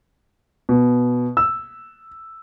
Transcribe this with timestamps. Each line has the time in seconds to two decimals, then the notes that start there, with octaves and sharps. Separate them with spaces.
0.69 B2
1.37 E6